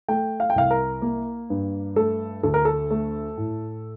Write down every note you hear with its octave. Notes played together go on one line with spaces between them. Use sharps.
A3 G5
F5
G5
C2 F5
A#4
A#3
G2
A3 A4
D2 A4
A#4
A4
A3
A2